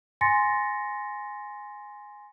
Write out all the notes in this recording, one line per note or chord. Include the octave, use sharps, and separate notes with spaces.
G#5 C6 A6 A#6 C#7